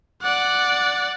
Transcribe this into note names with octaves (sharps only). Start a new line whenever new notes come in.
D5 F#5